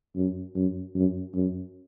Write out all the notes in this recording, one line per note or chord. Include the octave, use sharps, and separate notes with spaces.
F#2
F#2
F#2
F#2